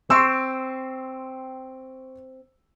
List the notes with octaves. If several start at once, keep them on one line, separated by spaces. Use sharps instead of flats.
C4 C6 C#6 E6